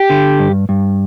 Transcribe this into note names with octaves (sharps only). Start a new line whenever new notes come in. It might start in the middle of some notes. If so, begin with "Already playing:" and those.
Already playing: G4
D3
G2
G2